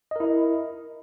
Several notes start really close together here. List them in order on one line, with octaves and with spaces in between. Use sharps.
D#5 A#4 E4